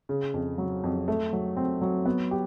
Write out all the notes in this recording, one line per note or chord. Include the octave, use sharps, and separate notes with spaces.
C#3
F2
F#3
F2
A3
F#3
C4
F#3
B3
G4